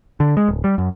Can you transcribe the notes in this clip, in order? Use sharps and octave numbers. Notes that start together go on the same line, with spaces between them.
D3
G#3
D1
G3
F#2